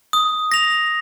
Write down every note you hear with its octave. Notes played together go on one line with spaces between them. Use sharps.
D#6
A#6 F7